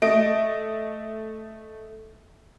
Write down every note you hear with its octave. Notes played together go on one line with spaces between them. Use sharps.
A3 D#5 D7